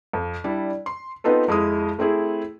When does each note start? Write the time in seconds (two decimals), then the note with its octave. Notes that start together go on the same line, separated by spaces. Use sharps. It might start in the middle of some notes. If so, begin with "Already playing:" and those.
0.13 F2
0.44 G3 D4 E4
0.86 C6
1.24 B3 C4 D#4 F4 A4 B4
1.48 F2 G#3 E4 D#6
1.99 A3 C4 E4 G#4